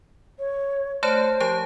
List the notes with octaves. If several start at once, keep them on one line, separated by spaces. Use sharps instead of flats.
C#5
A3 C5 C#5 A5
F3 G4 A5